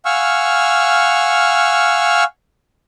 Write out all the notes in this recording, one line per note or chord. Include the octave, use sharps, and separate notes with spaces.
F5 F#5 G#5 C#6 E6 F6